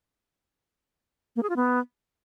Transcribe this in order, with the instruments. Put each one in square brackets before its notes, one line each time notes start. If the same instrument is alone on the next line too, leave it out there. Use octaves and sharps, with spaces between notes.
[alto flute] A#3
G#4
F4
B3